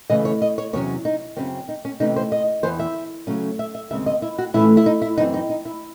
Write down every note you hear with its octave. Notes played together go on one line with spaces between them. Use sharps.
C#3 E3 A3 D#5
C#5
D#5
C#5
E2 C3 F#3 C#4 C#5
D#4
F#2 C#3 F#3 C4 C#4
D#4
C#4
C3 E3 A3 C#4 D#4
C5
D#5
E2 C#3 E3 C5
E5
C#3 F#3 A3 C#4
E5
E5
D#2 C#3 G#3 C4 E5
D#5
E4
F#4
A2 E3 A3 C#4 E4
E4
D#4
E4
F#2 E3 C4 D#4
D#4
D#4
E4